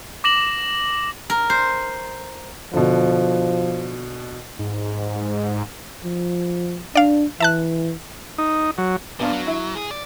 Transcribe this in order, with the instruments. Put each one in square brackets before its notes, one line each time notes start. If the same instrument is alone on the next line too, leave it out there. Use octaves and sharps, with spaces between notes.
[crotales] D6 A#6 E7 F#7
[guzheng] A#4
C5
[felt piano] B2 D3 [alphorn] F3
[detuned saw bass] G#2
[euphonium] F3
[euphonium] D4 [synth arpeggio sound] D5 F5
[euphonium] E3 [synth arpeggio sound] E5 A5 F#6
[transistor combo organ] D#4
F#3
[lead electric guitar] F#2 A#2 [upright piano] B3 D4 F5
[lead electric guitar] F#3
[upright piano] E4
[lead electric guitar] G#4
D5